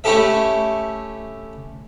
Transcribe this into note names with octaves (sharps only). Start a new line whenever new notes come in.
A3 C#4 E4 G4 A4 E5